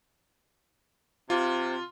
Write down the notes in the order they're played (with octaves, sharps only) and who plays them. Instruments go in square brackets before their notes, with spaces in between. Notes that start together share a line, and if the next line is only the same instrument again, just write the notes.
[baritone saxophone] C3 [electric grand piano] F4